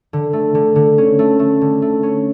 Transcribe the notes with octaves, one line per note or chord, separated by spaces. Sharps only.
D3
A3
D3
D3
C#4
A3
A3
D3
A3
C#4